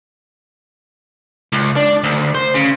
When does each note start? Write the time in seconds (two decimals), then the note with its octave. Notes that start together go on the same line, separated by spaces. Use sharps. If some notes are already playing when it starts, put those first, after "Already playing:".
1.52 C#2
1.76 D4
2.04 D2
2.35 C5
2.55 C#3